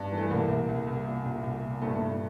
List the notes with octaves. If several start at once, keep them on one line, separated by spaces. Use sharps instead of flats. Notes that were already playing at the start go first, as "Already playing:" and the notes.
Already playing: G2
E3
A3
C2 A#3
C2
C2
C2
A#2
C2
C2
A#2
G2 A3
G2